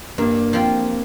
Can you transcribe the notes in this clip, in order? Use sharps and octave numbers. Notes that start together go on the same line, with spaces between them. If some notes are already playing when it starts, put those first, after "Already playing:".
G2 A#3
F3 C4 F4